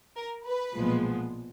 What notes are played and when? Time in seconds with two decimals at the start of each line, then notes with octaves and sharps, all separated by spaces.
0.17 A#4
0.46 B4
0.75 B1 A#2 F3 G#3 B3